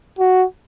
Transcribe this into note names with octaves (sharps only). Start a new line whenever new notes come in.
F#4